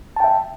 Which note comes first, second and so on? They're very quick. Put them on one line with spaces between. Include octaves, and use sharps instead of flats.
A5 G5 E5